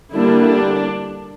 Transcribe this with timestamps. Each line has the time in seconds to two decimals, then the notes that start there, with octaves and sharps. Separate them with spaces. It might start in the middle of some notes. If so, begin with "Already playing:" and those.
0.13 D3 G3 A#3 D4 E4
0.48 D4